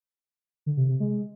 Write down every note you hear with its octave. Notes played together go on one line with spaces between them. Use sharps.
D3
C3
C3
G#3